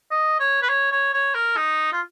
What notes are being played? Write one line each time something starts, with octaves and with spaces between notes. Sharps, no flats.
D#5
C#5
B4
C#5
C#5
C#5
A#4
D#4
F4